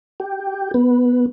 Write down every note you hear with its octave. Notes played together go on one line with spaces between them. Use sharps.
G4
B3